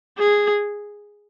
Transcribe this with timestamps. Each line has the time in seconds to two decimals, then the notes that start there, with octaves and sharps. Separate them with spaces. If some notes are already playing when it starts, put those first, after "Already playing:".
0.18 G#4